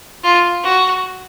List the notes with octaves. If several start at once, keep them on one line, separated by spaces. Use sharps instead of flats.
F4
F#4